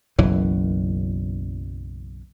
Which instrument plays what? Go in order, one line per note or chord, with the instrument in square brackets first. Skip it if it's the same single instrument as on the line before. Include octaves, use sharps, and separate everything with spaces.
[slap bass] F#1 B1 F#2 E3